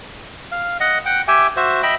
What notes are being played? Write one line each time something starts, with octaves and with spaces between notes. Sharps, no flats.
F5
D#5 F#5
F#5 G5
G4 E5 G5 G#5
F#4 C5 E5
D#5 E5 G5 B5